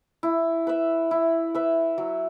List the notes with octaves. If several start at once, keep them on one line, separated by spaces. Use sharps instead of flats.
E4
B4 E5
E4
B4 E5
F#3